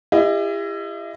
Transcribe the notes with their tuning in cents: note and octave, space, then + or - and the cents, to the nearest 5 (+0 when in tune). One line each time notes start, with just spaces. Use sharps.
E4 +30 G4 +40 D#5 +0